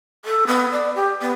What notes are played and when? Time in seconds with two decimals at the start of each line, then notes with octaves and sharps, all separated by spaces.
0.25 A4
0.47 B3
0.72 D5
0.95 G4
1.21 B3